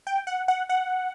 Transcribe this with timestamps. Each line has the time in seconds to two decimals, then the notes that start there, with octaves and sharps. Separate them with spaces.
0.07 G5
0.27 F#5
0.48 F#5
0.69 F#5